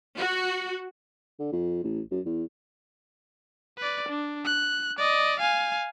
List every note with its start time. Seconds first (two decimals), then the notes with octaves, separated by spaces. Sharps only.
0.18 F#4
1.40 D3
1.52 F2
1.84 A1
2.11 F#2
2.26 E2
3.78 B4 D5
4.09 D4
4.45 F#6
4.98 D5 D#5
5.40 F5 G#5